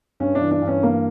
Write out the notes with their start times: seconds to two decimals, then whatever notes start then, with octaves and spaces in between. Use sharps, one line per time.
0.20 G2 C#4
0.35 D4
0.41 E3
0.51 D4
0.62 G2
0.68 C#4
0.83 E3 A#3